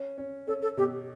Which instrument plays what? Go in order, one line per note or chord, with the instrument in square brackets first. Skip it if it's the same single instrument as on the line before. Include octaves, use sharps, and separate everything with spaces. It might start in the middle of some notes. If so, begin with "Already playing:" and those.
Already playing: [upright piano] C#4
C#4
[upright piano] C#4 [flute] A4
[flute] A4
[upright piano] B2 [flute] G4